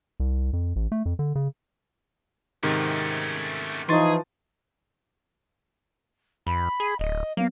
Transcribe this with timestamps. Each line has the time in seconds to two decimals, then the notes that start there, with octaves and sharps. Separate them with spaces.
0.20 C2
0.53 F2
0.76 A1
0.92 A3
1.06 F2
1.19 D3
1.35 C#3
2.63 G#2 C3 D#3 A3 C#4
3.89 E3 F3 D#4 G#4 C6 C#6 A6
6.47 F2 B5
6.80 G#4
6.99 D1 D#5
7.37 F#3 A#3 B3 F5